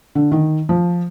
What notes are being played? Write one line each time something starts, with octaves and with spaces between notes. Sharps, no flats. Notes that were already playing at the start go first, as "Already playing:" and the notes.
D3
D#3
F3